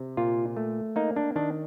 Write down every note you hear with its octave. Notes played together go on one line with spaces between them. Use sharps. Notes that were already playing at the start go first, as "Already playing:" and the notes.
Already playing: C3
A#2 F4
A3
A#3 D#4
D4
D#3 D4